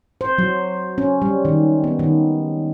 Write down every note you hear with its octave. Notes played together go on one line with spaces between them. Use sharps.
C5
F#3
C#4
G3
D#3
B3
D#3